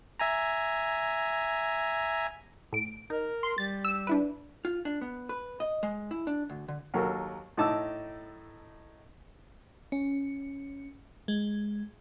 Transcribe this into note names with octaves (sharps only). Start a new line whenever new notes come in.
E5 G#5 A#5
A2 D7
D#4 A#4
C6
G3 A6
E6
D4 E4 B4
F4
D4
B3
B4
D#5
G#3
E4
D4
D2
D3
D#2 F#3 A4 A#4
A2 D#4 A5 D6 E6
C#4
G#3